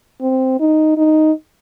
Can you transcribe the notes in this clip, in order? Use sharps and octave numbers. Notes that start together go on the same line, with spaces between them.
C4
D#4
D#4